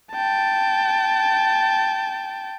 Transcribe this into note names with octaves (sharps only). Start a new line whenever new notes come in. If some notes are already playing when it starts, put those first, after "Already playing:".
G5 A5